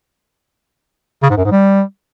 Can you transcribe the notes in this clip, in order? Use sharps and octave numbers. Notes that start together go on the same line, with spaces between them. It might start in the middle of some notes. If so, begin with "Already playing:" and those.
C#3
G#2
F#2
G#2
G3